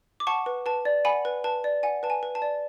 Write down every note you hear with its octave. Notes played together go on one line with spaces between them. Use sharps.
D6
F#5 A5 C#6
B4
B4 A5
D5
F#5 G#5 B5
B4
B4 A5
D5
F#5 G#5
B4 A5
G#5
B4
A5
D5